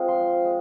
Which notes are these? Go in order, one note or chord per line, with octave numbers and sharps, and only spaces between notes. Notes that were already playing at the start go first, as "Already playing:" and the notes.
Already playing: G#3 C4 F4
F3 C6
G#3